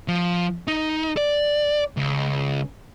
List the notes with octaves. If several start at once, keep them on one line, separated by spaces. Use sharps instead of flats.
F3
D#4
D5
C#2